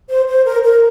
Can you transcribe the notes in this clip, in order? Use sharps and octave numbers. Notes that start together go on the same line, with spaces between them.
C5
C5
A#4
A#4